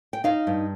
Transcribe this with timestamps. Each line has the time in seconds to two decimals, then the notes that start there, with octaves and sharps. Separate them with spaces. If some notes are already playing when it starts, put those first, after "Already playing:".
0.13 G5
0.24 D#4 F5
0.47 G2